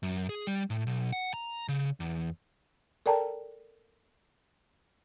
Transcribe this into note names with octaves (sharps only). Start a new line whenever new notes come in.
F#2
G#4
G3
A2
B1
F#5
A#5
C#3
E2
A4 A#4 D5 G5 A5 A#5